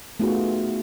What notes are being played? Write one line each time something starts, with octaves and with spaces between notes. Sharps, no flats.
A3 B3 D#4 F4 F#4 G#4